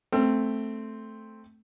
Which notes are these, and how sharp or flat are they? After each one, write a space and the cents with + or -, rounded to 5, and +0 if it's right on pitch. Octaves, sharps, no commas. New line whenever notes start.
A3 +0 C4 +0 E6 +40